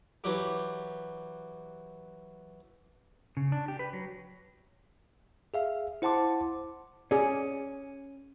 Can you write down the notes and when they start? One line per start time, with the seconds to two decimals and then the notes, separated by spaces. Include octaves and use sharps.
0.24 E3 F#3 G4
3.37 C#3
3.52 D4
3.68 G4
3.79 B4
3.93 F#3
5.54 G#4 E5 F5
6.02 E4 C5 F#5 A5 C6 D6
7.11 C#4 G#4 D5